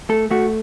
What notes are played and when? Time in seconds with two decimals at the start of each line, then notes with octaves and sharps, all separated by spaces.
0.09 A3 A4
0.31 A3 F#4